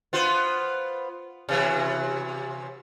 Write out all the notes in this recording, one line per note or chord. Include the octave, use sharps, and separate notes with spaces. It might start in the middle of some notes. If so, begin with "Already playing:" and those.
B3 F4 C5
C3 E3 F#3